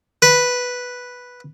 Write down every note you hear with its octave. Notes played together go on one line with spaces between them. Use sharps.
B4